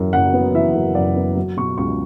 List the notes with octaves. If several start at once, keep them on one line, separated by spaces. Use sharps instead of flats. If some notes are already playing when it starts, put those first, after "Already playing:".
Already playing: F#2 E3
F#1 F#5
B3
E3 E5
F#2
F#1 D5
B3
F#3
B2 C#6
C#2 C#6